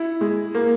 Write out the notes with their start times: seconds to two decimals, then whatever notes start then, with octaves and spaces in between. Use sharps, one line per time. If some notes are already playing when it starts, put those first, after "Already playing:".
Already playing: E4
0.21 G#3
0.55 A#3